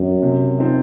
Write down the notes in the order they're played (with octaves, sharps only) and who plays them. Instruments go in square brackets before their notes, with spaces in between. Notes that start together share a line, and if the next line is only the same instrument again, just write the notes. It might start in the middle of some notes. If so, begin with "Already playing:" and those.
Already playing: [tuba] F#2
[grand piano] C3
F3 C4 D#4